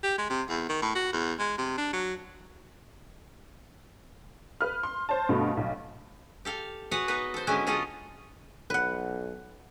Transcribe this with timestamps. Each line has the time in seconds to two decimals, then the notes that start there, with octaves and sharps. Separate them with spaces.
0.03 G4
0.18 G#3
0.30 C3
0.50 E2
0.69 D#3
0.82 A2
0.95 F#4
1.13 E2
1.39 G#3
1.58 C3
1.78 D4
1.93 F#3
4.61 B4 F6
4.83 C6
5.09 C5 C#5 A5
5.29 G2 B2 A3
5.57 B1
6.45 G4 A4 F5
6.91 F#4 G#4 B4 C#5 F#5
7.08 B3 D#4 B4 D#5
7.34 A4 C5
7.47 D3 F#3 G#3 B3 C#4 E4
7.67 C#4 F4 G#4 A4 D#5
8.70 B1 B4 F#5